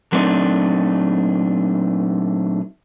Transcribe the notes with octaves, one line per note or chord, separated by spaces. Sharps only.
A#2 F#3 A3 C4 D4 D#4